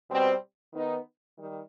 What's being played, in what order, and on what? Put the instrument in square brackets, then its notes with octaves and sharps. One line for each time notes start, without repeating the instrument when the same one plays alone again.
[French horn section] B2 G3 C4
D#3 B3 D#4
D#3 G3